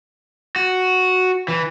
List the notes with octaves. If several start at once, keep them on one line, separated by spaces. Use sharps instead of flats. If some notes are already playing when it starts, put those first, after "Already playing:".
F#4
E3